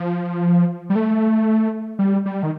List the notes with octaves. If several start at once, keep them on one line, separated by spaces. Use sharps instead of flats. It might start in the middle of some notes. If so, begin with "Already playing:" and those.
Already playing: F3
G3
A3
G3
G3
D#3